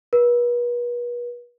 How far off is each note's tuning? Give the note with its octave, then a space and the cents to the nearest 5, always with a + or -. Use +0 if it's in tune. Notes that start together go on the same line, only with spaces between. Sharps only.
B4 -40